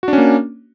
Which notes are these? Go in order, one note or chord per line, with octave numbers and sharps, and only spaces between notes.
A#3 C#4 D4 F#4